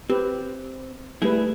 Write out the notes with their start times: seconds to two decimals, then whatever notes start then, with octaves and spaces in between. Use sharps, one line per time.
0.10 C4 G4 B4
1.22 G3 A3 E4 G#4 B4